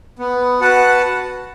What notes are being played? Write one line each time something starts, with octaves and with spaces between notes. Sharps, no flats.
B3
F#4 B4 F#5 A5